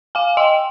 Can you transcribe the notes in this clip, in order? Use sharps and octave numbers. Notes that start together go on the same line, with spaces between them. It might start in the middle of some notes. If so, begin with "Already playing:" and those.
F5 G#5
D#5 G5